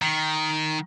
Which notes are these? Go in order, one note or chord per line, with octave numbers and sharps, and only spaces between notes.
D#3